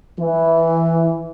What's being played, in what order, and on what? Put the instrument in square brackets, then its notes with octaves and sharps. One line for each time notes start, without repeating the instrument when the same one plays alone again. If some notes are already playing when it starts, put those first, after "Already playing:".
[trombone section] E3